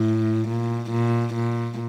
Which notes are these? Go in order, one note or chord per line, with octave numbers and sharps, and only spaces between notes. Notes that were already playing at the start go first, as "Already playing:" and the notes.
Already playing: A2
A#2
A#2
A#2